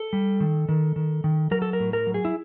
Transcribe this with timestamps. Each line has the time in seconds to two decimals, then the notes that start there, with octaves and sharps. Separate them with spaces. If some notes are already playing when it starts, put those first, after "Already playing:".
Already playing: A4
0.13 G3
0.40 D#3
0.69 D#3
0.96 D#3
1.24 D#3
1.51 F#3 A#4
1.62 A4
1.73 A#4
1.80 A2
1.93 A#4
2.07 F#3
2.14 G#4
2.25 E4